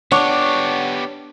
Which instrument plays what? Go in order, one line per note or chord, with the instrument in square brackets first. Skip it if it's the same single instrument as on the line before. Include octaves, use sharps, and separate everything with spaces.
[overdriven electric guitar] B3 G4 [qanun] D4 [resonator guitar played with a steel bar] C#5 [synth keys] F#5 C#6